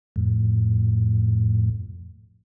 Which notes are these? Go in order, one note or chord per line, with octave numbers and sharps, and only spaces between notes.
F2 A2